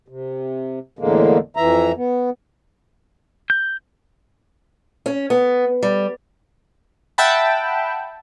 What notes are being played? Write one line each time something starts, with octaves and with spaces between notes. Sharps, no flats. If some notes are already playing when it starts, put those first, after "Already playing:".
C3
E2 A2 D3 G#3 A#3
F2 E3 E5 A#5
B3
G6
C#4
B3
G3
E5 F#5 G5 A5 B5